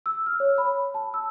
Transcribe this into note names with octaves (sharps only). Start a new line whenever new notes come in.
E6
F6
C#5
B5
A5
E6